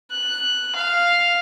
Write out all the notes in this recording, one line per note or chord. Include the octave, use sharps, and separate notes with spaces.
F#6
F5